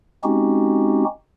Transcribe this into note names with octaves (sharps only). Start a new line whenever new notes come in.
G#3 C4 C#4 D#4 F#4 G4